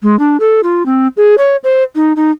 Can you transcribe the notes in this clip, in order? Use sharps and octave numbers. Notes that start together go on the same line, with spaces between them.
G#3
D4
A4
F4
C4
G#4
C#5
C5
D#4
D#4